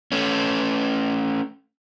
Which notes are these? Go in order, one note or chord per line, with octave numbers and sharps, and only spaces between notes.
A3 C#4